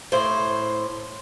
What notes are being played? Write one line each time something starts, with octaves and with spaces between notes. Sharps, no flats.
A2 C5